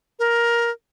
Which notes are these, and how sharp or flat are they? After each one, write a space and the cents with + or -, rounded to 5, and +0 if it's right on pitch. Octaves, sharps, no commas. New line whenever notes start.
A#4 +10